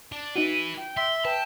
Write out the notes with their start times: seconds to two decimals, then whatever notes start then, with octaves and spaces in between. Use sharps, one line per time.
0.12 D4
0.36 D#4 E4 F#4 B4 D#7
0.77 G5
0.97 E5 C6
1.25 B4 G5 A5